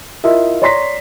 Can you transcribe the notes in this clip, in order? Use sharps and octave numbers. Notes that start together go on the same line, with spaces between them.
E4 F4 A#4 D#5 E5
C#5 D5 A#5 C6 A#6 B6